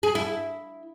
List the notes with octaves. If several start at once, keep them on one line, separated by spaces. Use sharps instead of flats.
G#4
E4